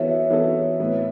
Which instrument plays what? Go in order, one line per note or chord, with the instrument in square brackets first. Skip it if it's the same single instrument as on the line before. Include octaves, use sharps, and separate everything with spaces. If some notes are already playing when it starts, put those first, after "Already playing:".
Already playing: [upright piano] E3 B3 F#4 A4 [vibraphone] C#5 E5
[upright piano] E3 B3 F#4 A4
A2 E3 B3